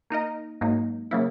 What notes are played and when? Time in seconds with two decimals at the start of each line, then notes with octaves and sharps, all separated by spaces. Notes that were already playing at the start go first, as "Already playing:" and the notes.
0.10 A#3 D#4 A#4 D#5
0.61 G#2 F#3 A#3 D#4
1.11 C#3 F#3 A#3 E4